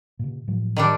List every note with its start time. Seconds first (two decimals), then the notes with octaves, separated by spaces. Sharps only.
0.19 A#2 C#3
0.47 A2 F3 F#3
0.76 D#3 G3 D4